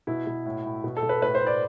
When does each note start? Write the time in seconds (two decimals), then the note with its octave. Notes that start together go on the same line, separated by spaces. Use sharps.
0.07 B2 E4
0.27 B2
0.46 A2
0.64 A2
0.84 B2
0.97 A4
1.03 B2
1.09 B4
1.21 A2 B4
1.35 C5
1.41 A2
1.47 D5